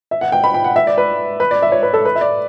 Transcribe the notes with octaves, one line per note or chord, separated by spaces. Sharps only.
E5
F#5
G5
B5
G5
F#5
E5
D5
B4
B4
D5
E5
C#5
B4
A4
B4
E5
D5